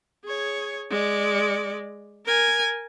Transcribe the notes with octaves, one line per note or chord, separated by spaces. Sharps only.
G#4 C#5
G#3 D5
A#4 G#5